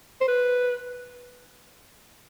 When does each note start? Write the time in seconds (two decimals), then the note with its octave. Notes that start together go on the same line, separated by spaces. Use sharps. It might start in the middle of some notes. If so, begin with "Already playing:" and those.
0.21 C5
0.28 B4